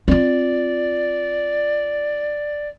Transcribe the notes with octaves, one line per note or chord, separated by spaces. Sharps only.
C4 F4 D5